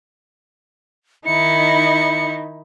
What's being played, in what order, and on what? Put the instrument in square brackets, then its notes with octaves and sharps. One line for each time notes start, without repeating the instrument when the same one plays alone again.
[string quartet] D#3 D#4 E4 [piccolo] C#7